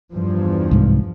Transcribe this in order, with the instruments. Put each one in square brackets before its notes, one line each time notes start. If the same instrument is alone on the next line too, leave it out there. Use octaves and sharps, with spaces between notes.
[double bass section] E2 G2 F3
[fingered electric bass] C2 G#2